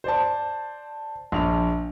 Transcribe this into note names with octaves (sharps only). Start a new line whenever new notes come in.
C5 D5 A5
A#1 F7